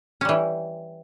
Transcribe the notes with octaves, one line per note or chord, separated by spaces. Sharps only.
E3 G3 C#4